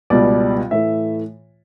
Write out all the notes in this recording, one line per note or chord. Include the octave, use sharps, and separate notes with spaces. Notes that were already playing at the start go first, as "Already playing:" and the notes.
C#2 B2 G3 D5
A2 E3 A3 E5